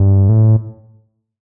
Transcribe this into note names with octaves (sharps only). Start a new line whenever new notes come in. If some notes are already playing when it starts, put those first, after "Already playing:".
Already playing: G2
A2